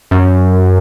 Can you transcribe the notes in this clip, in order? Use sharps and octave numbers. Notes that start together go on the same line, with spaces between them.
F#2